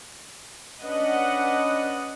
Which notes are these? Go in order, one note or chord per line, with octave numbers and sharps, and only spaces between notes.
C#4 D4 B4 D#5 F#5